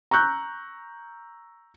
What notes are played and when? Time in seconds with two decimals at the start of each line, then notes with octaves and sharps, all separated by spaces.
0.11 A#5 C#6 E6 F#6 G6